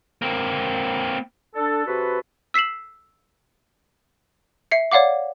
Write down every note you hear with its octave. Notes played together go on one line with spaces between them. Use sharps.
A#3 C4
D4 A4
C3 F#4 A4 B4
E6 B6 C7 E7 F#7
E5 C7 C#7
C#5 D5 F5 F#5 D6